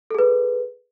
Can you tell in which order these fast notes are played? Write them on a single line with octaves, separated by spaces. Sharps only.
A4 G#4 B4